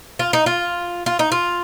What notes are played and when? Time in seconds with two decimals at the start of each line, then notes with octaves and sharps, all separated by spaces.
0.19 F4
0.33 D#4
0.46 F4
1.06 F4
1.19 D#4
1.32 F4